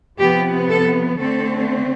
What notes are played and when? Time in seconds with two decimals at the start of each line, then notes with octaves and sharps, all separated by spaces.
0.18 C3 F3 B3 G4
0.69 A4
1.18 D3 A3 C4 A4